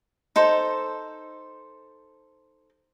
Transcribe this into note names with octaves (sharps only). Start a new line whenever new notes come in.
D#4 A4 C5